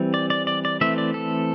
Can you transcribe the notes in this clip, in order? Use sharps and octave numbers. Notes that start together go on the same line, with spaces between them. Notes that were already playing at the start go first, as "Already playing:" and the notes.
Already playing: E3 G3 C4
D5
D5
D5
D5
E3 A3 C4 E5
D5
A4